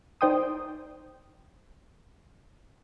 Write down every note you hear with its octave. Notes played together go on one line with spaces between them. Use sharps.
D#4 C5 D5 G5 C6 D#6